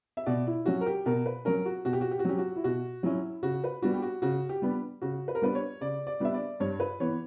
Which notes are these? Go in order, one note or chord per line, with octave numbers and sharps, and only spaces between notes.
E5
B2 D5
E4
F#3 C#4 F#4
A#4
G4
B2 A#4
B4
F#3 C#4 A#4
F#4
B2 F#4
G4
F#4
G4
F#4
F#3 C#4 G4
F#4
E4
B2 F#4
F#3 C#4 E4
C#3 F#4
B4
G3 B3 D4 F#4
G4
F#4
C#3 F#4
G4
G3 B3 D4
C#3 F#4
B4
A#4
G3 B3 D4 B4
C#5
C#3 D5
D5
G3 B3 D4 E5
D5
G2 C#5
B4
E3 B3 C#5